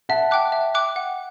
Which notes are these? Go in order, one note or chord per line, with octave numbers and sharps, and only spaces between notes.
E5 F#5 A5
G5 D6 F#6
E5
G5 D6 F#6
F#5